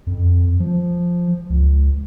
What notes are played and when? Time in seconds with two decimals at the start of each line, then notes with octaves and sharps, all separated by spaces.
0.07 F2
0.60 F3
1.50 C#2